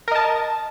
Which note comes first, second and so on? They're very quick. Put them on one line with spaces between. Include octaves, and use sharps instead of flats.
A#4 D#5 A5